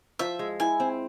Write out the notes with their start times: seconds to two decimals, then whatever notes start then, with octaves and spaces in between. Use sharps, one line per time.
0.19 F3 E5
0.39 G#3
0.60 E4 G#5
0.80 C4